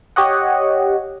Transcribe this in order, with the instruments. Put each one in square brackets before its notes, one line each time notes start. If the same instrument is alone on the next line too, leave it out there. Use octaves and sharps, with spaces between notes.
[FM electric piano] G4 C#5 D#5 F#5